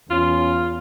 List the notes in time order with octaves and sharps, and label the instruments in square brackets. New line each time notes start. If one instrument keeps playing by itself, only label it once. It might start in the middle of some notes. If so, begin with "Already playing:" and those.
[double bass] E2 [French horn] C#4 [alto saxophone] F4